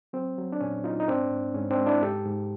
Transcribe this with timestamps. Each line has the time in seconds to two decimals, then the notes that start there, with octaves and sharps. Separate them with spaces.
0.13 F#3 C4
0.38 F#3
0.52 D4
0.61 A#2 C#4
0.84 F#3 D#4 F4
1.00 D#4
1.08 G#2 C4 D4
1.31 G#2
1.54 G#2 C#4
1.71 C4 D4
1.78 G#3
1.86 D4 E4
2.01 G#2 G4 A4
2.26 G#2